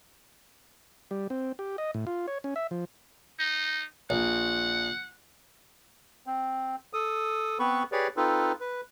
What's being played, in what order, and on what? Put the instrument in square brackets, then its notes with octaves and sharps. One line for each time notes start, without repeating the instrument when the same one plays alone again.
[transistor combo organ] G3
C4
G4
D#5
A2
F4
C#5
C#4
E5
F3
[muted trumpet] D#4
[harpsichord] A#1 [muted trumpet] F#5
[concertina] C4
A4 D#6
B3 C4 B4 B5 C#6
G4 G#4 B4 C#5 D5
C4 D#4 F4 A4 B4
B4